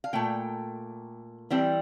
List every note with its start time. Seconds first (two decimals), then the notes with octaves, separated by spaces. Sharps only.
0.04 F5
0.13 A#2 A3 G5
1.50 E3 G3 C4 G5